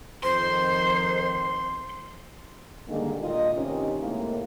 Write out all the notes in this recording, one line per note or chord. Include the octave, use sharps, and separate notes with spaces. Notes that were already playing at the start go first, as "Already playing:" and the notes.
F2 D#3 C5 C6
D3 D#3 G3 G#3 A#3
A#2 F4 D#5
G2 C3 D#3 C#4
A2 C3 G#3 A#3